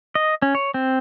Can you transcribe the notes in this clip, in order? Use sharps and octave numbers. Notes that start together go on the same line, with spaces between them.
D#5
C#4
C#5
C4